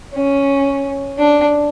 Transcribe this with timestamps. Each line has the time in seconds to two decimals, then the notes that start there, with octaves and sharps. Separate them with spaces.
0.14 C#4
1.19 D4